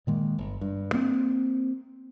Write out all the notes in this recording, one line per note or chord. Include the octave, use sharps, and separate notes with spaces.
A#2 D#3 G#3 A#3
G1
G2
A#3 C4